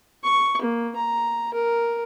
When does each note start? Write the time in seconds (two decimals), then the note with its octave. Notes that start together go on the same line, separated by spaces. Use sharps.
0.23 C#6
0.61 A#3
0.96 A#5
1.54 A#4